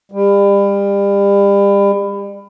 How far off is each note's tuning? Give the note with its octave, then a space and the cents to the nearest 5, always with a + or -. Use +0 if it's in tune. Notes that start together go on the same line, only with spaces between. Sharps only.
G3 +30